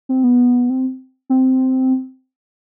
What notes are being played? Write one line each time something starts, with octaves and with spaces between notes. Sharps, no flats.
C4
B3
C4
C4